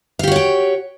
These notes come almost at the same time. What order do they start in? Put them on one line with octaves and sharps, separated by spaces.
F5 G4 F#4 C#5 G5